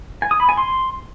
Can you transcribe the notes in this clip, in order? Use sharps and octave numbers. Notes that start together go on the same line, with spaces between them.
G#5
D#6
B5
G#5
C6